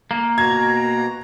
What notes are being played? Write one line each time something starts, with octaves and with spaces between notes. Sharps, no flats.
A#3
B2 F#4 A#5 G#6